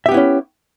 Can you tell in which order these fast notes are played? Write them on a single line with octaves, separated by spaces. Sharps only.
E5 G4 B3 E4 C#4